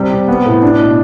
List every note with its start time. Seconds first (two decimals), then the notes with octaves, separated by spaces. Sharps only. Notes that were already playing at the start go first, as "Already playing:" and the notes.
Already playing: C3 G3
0.11 C3
0.28 B3
0.46 A2
0.62 D4
0.80 B2